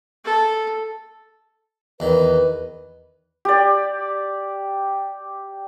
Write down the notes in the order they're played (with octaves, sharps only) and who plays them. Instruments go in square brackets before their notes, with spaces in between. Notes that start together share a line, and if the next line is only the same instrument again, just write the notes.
[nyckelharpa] A4
[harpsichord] E2 D#3 [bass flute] B4
[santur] G4 D5